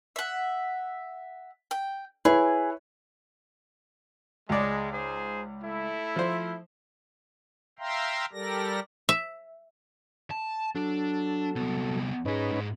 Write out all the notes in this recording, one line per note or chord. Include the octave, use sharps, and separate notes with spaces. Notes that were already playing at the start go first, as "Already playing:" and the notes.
E5 F#5
G5
E4 G#4 B4 C#5
C#2 G#3 D5
D#4 G#4 C5
A3 E4
F3 C5
E5 F5 G5 A#5 C6
G3 G4 A4 A#4 D5 A#6
E5
A5
F#3 D4 A4
C2 B3
G#2 C#4 D#4 G#4 B4
G#2